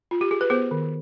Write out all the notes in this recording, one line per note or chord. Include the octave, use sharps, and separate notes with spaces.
F4
G4
G#4
B4
B3 G#4 C5
D#3